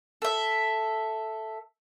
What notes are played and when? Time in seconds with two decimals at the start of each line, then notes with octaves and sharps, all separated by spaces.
0.22 A4 E5